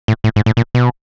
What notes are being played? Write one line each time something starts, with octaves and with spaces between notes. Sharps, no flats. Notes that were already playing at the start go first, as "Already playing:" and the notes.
A2
A2
G#2
A2
A#2
B2